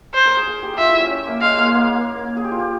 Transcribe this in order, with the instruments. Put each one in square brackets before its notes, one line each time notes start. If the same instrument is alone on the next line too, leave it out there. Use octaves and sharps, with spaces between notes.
[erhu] C5
[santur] A#4
G#4
G#4
G4
[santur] F4 G4 [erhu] E5
[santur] E4
C#4
C#4
A#3
[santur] G#3 [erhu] F5
[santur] A#3
G#3
A#3
G#4
G4
F4
G4